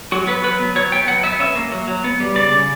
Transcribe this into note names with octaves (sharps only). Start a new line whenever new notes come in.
F#3 F#4
B3 B4
F#3 B4
B3
F#3 C#5
B3 G5
F#3 F#5
B3 E5
C#4 E5
A#3
F#3
F#3
B3
G3
C#3 D5
C#3